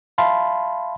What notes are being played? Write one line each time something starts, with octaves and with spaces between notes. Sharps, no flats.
E5 F5 A5 B5 C6